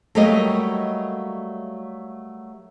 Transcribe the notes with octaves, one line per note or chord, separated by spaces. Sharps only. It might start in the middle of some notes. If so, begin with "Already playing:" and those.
F#3 G3 A3 A#3 G4 D#5